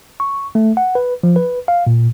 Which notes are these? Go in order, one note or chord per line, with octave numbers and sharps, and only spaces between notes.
C#6
A3
F#5
B4
F3
B4
F5
A#2